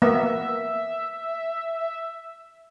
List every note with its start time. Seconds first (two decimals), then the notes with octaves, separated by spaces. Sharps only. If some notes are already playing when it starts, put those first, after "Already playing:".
0.02 A#3 B3 E5